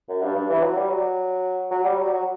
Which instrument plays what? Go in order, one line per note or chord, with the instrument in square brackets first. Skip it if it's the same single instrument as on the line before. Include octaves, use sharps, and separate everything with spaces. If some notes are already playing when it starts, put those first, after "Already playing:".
[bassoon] F#2
G2
G2
E3
F#3
G3
F#3
F#3
G3
F#3
F#3